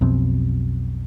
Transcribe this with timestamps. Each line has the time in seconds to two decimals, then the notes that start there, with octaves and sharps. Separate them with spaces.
0.01 B1 F2 B2 C4